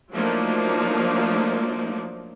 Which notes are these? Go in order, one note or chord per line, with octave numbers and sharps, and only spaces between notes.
F3 F#3 A3 A#3 D4 D#4